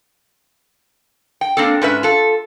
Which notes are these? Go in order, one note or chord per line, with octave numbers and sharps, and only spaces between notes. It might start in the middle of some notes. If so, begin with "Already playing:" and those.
G5
A#3 C4 D4 A4
G#2 C#4 B4 E5
F4 A4